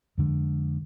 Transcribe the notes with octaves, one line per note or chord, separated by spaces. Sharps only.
F2 D3 G#3